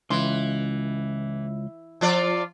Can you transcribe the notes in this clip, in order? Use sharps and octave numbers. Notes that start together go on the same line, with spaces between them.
C#2 E3 C6
F3 F4 D5